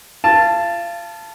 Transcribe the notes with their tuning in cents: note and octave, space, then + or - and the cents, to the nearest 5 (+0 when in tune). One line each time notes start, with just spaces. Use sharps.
F4 -30 A5 +0